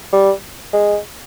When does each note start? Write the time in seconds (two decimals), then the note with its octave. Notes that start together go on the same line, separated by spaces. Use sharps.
0.13 G3
0.73 G#3